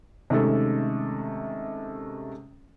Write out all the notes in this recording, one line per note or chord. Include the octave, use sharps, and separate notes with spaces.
C3 D#3 G#3 A3 C#4 A4